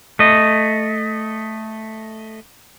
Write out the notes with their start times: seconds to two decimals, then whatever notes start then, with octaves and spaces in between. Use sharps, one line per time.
0.19 A3 D#5